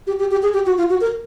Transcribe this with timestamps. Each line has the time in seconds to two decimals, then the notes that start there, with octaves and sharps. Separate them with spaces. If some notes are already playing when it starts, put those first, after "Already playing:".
0.07 G4
0.19 G4
0.31 G4
0.42 G#4
0.53 G4
0.66 F#4
0.78 F4
0.89 F#4
1.01 A#4